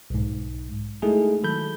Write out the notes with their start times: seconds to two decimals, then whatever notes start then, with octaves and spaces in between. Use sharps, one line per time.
0.10 B1 G#2
1.02 G#3 A3 D#4 E4 G#4 A4
1.43 D#3 F#3 A4 B5 G6